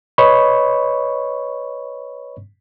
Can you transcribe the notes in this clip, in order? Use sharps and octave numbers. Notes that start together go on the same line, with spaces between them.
B4 C#5 D#5 B5 C#6